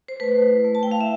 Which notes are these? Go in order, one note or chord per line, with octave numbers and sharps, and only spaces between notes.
C5
A3 B4
E4
A3
A5
G5
E4 F5
E5